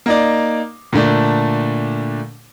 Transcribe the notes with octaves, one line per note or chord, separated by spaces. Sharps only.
A#3 D#4 D5
A#2 D3 A3 D4